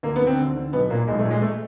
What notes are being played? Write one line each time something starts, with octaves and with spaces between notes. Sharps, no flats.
D2 A#3
B3
D3
C4
D2
D3
B1 B3
A#2 A#3
B1 G#3
A3
A#2
G#3
A3